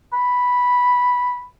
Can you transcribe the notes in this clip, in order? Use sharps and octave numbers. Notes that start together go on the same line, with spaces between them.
B5